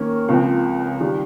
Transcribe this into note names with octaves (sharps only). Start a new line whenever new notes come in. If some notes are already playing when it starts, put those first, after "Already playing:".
Already playing: D#3 A#3 C#4 A#4
C#2 C#3 F3 C4
D#3 G3